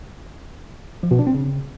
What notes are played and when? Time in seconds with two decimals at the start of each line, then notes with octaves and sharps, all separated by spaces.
1.03 F3
1.11 B2
1.19 D4
1.27 C4
1.35 C#3